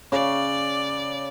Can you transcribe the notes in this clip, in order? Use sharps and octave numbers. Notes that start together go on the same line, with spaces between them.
C#3 D5